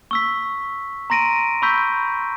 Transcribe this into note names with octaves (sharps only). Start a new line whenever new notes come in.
C#6 E6 B6
A#5 C6 A#6 D7 D#7
B5 C#6 E6 G6 B6